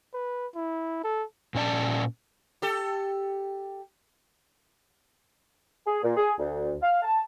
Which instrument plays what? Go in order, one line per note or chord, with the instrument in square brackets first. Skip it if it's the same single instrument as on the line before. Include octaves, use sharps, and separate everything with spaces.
[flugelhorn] B4
E4
A4
[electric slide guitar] A#2 C#4 D5 A5
[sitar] G4 A4
[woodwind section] G#4
A#2
G#4
D2
F5
A5